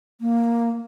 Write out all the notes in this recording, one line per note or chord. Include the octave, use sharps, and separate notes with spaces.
A#3